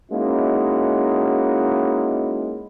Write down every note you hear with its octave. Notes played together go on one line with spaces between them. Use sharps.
G#3 A#3 C#4 D#4 E4 F#4